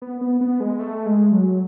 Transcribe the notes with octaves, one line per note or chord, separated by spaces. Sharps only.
B3
B3
B3
G#3
A3
G#3
F#3